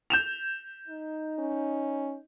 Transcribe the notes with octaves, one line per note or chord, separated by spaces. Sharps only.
G6 E7 F7
D#4
C#4